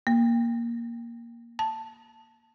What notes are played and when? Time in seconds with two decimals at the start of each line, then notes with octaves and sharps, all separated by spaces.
0.07 A#3
1.59 A5